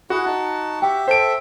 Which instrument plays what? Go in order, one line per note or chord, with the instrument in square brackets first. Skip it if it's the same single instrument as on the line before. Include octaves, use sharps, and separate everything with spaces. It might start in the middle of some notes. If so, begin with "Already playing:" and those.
[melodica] E4 G#4 F#5 [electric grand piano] F#4
[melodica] D#4 A5
[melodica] G4 E5 [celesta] G5
[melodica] A4 E5 [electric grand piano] C5 D7